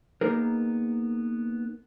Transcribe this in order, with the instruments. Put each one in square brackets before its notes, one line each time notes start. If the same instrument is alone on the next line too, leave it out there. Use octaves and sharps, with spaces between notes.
[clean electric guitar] A#3 B3 D#4 G#4 A#4